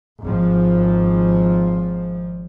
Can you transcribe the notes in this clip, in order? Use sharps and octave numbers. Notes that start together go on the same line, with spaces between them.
G#1 F3